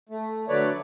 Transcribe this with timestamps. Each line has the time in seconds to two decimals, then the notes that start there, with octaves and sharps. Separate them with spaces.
0.09 A3
0.49 D3 F#3 A3 B4 C#5 D5